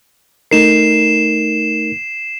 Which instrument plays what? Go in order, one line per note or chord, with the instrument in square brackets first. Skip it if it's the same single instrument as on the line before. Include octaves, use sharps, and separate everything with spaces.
[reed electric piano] A3 D#4 A#4 [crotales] C7 E7